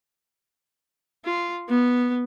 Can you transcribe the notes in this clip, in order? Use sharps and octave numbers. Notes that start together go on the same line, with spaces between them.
F4
B3